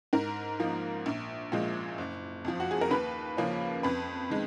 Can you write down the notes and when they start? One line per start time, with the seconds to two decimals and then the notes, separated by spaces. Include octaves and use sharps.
0.13 G#2 A#4
0.60 F3 A#3 D#4
1.06 A#1
1.52 A#2 F3 G#3
1.98 F#1
2.45 F2 F3
2.60 F#4
2.71 G#4
2.81 A#4
2.91 D#2 B4
3.37 C#3 F3 A#3 C#4
3.83 F2 B4
4.30 D#3 G#3